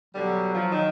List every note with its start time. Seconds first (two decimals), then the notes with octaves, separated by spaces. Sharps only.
0.15 B2 D3 F#3 G3
0.54 F3
0.71 D#3